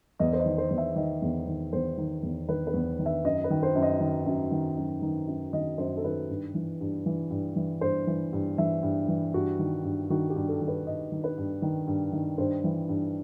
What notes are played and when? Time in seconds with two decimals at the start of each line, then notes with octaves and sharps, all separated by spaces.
0.19 E2 D#5
0.33 C5
0.40 D#5
0.46 D#3
0.58 C5
0.71 E2
0.78 E5
0.96 D#3 D#5
1.22 E2
1.47 D#3
1.73 E2 C5
1.98 D#3
2.23 E2
2.48 D#3 B4
2.67 B4
2.74 E2
2.99 D#3
3.06 E5
3.25 F#2 D#5
3.44 B4
3.50 D#3
3.63 C5
3.76 F#2
3.82 D#5
4.00 D#3
4.26 F#2
4.51 D#3
4.77 F#2
5.02 D#3
5.28 F#2
5.53 D#3 D#5
5.78 F#2 C5
5.97 A4
6.04 D#3 B4
6.30 G2
6.55 E3
6.81 G2
7.06 E3
7.30 G2
7.56 E3
7.81 G2 C5
8.07 E3
8.33 G2
8.58 E3 E5
8.83 G2
9.08 E3
9.34 G2 F#4
9.59 D#3
9.84 G2
10.10 D#3 F#4
10.30 G4
10.36 G2
10.48 A4
10.61 D#3
10.68 B4
10.86 G2 D#5
11.12 D#3
11.24 B4
11.37 G2
11.62 D#3
11.88 G2
12.13 D#3
12.38 G2 C5
12.64 E3
12.89 G2